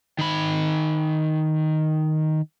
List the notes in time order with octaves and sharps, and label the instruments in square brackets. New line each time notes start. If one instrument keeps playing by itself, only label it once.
[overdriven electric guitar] D#3 B5